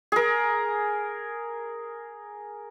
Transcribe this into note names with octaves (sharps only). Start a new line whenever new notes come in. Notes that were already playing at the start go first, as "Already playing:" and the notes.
G#4 A#4